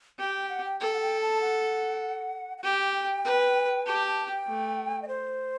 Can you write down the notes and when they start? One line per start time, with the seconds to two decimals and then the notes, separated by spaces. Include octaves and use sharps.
0.19 G4 G5
0.35 G5
0.49 F#5
0.64 G5
0.80 A4 G5
0.94 F#5
1.01 G5
1.21 A5
1.41 F#5
2.58 F#5
2.64 G4 G5
3.25 B4
3.86 G4 A5
4.07 A5
4.27 G5
4.47 A3
5.02 D#5
5.08 C5